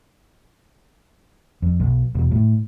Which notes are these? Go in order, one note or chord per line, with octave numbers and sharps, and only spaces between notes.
F2
B1
E1
A2